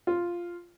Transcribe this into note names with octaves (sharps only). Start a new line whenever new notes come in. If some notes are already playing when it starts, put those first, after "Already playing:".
F4